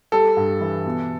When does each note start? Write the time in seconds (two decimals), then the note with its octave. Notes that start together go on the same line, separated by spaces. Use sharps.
0.12 G3 A4
0.37 G2
0.61 E3
0.86 B2